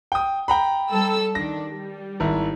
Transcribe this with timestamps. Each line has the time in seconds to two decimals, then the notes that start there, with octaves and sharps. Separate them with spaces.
0.12 G5 D#6
0.48 G5 A#5 B5
0.91 G3 A4 E6
1.35 D#3 D4 A#6
1.69 G3
2.20 G#1 E4